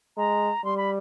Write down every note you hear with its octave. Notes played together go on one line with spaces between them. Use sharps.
G#3 A#5
G3 C6
B5